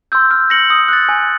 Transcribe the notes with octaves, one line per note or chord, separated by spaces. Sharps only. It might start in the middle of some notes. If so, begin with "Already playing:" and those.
C6 E6 G6
F6
A#6 C#7 F#7
D#6
F#6 A6
G#5